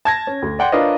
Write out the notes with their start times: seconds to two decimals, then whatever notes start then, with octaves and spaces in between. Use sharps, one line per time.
0.05 A5 G#6 A#6
0.27 C#4
0.42 D2
0.59 D5 F#5 G5 C6
0.72 D4 F4 A#4 B4 C#5 D#5